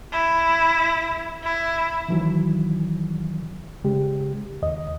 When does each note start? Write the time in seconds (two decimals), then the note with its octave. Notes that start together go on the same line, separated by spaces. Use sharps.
0.12 E4
1.43 E4
2.09 D#3 E3 F#3
3.84 C#3 G#3 G4
4.62 D#2 D#5